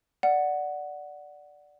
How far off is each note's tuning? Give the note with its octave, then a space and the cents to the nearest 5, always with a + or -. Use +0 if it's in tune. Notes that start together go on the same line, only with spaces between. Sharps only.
D5 +0 F#5 +0